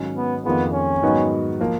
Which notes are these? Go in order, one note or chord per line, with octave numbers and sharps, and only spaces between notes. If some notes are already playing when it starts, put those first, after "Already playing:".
Already playing: G#2 D#3 F#3 C#4
B3
F2 D#3 A#3 B3 F4 G#4
C#4
G#2 D#3 F#3 B3 F#4
F3 A#3